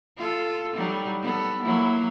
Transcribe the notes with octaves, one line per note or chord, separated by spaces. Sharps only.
F4 A4
F#3 G3 D#4
B3 A4
F#3 A#3 E4